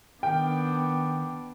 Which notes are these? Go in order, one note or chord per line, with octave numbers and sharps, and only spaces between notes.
D#3 B3 D4 A#4 G5